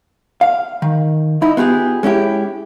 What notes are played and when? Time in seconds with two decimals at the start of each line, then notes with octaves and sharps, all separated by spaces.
0.41 F5
0.82 D#3
1.42 D#4 E4
1.57 B3 F4 G4 G#4
2.03 G#3 C#4 E4 G4